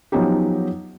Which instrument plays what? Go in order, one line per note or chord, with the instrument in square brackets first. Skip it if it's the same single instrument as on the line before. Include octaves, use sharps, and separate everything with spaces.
[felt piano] F3 F#3 B3 C#4 D#4 G4